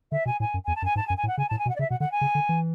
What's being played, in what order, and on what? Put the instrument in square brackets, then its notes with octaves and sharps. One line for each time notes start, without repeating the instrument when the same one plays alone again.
[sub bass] D3 [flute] E5
[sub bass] B2 [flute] G#5
[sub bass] A2 [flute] G#5
[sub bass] F#2
[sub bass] E2 [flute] G#5
[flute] A5
[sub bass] F#2 [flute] G#5
[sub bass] G#2 [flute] A5
[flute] G#5
[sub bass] F#2
[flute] G#5
[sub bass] A2
[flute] F#5
[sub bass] C#3 [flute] G#5
[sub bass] A2 [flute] A5
[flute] G#5
[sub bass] B2
[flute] F#5
D5
[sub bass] C#3 [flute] E5
[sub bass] B2 [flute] F#5
[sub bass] D3 [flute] F#5
[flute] G#5
[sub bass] C#3
D3
E3